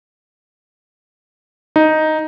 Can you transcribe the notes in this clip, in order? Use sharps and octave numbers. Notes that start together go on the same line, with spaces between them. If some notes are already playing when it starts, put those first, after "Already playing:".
D#4